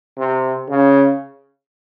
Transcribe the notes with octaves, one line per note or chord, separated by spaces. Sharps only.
C3
C#3